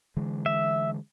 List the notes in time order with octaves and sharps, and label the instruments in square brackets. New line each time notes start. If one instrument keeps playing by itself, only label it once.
[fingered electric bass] D3 E3 G#3
[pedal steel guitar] E5